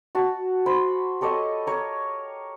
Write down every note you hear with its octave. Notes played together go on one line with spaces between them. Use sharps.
F#4 A5
C5 B5
G4 A4 C#5 D#5
A#4 C#5